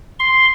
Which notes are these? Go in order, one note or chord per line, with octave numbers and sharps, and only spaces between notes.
C6